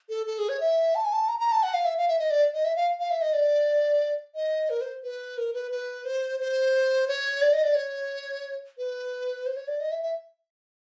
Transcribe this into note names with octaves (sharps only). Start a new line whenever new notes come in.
A4
A4
G#4
C#5
E5
A5
G#5
A5
A#5
A#5
A5
F#5
F5
E5
F5
E5
D#5
D5
D#5
E5
F5
F5
E5
D#5
D5
D#5
A#4
C5
B4
A#4
B4
B4
C5
C5
C#5
D5
D#5
D5
C#5
B4
C5
C#5
D5
D#5
E5
E5